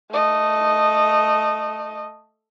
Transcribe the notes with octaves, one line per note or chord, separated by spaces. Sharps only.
A3 D#5